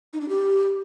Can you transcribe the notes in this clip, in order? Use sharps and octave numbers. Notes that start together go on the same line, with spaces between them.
D#4
D4
G4